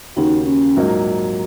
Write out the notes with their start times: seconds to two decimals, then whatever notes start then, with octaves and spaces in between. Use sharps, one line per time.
0.16 D#2 C#3 A#3 D#4 F#4
0.46 C#4
0.76 A#1 G#2 F#3 A#3 D#4